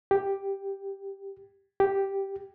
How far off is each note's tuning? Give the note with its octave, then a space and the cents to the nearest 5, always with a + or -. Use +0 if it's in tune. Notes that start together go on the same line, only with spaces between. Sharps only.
G4 +0
G4 -5